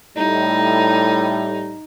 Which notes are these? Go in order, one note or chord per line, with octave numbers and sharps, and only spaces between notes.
A2 G3 D#4